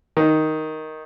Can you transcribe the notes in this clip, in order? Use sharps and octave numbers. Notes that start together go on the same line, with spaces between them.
D#3